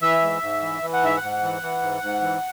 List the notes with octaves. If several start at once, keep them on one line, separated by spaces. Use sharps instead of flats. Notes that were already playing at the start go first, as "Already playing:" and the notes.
E3 E5
G#2
G#2
E3
E3
F#5
G#2 E5
F#5
G#2
E3
E3
G#2
G#2
E3